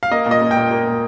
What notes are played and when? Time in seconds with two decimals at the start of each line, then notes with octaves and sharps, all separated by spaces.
0.03 F5
0.11 A#3 D#5
0.26 A#2
0.31 D#5
0.41 A#3
0.51 G5
0.56 A#2
0.71 A#3
0.86 A#2